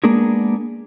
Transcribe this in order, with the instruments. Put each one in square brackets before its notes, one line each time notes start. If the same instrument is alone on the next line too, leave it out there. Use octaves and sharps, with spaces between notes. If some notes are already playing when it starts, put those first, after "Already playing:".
[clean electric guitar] G#3 A#3 B3 D4 G#4 A#4